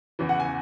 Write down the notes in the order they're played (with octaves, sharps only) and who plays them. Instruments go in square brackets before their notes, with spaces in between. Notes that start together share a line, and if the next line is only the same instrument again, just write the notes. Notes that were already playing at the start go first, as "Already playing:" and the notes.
[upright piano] E2 C#3 E3
F#5
G#5